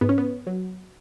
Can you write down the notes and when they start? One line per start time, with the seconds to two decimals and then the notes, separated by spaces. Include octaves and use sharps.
0.01 G#2 B3
0.09 C#4
0.18 B3
0.47 F#3